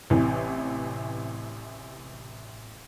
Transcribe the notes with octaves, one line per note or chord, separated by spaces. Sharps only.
A1 C3 E3